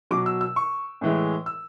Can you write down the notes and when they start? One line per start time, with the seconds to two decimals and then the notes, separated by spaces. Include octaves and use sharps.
0.11 B2 F#3 D6
0.26 E6
0.41 E6
0.56 C#6
1.01 A2 E3 G#3
1.46 E6